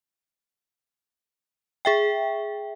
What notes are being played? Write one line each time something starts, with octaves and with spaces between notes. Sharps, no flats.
G#4 E5 G5